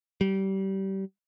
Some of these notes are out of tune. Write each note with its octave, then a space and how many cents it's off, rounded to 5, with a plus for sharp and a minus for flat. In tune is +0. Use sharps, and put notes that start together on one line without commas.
G3 -25